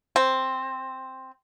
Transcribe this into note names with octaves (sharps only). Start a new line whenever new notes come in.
C4